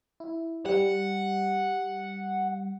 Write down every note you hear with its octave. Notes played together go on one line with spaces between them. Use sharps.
E4
G3 F#5